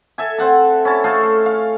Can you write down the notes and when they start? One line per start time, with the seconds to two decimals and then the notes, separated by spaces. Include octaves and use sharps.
0.18 A4 E5 G#5
0.38 C4 F#5 A5
0.85 C#4 E4 A5
1.04 A3 G#4 A4 F5
1.21 A4
1.46 F5